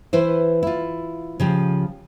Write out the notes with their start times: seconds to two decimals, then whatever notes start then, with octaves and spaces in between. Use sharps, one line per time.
0.13 E3 E4 B4 C5
0.63 E4 F4
1.40 C#3 F3 G4